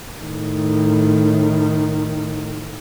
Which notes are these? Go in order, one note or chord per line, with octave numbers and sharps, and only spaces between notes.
A2 D#3